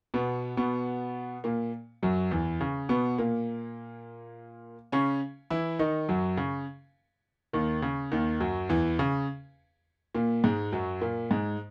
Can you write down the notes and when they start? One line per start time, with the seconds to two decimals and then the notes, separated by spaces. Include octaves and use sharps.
0.14 B2 B3
0.57 B2 B3
1.44 A#2 A#3
2.03 F#2 F#3
2.31 E2 E3
2.61 C#3
2.89 B2 B3
3.18 A#2 A#3
4.92 C#3 C#4
5.50 E3 E4
5.79 D#3 D#4
6.09 F#2 F#3
6.37 C#3
7.53 D#2 D#3
7.82 C#3
8.12 D#2 D#3
8.40 F#2 F#3
8.69 E2 E3
8.99 C#3
10.15 A#2 A#3
10.44 G#2 G#3
10.73 F#2 F#3
11.01 A#2 A#3
11.31 G#2 G#3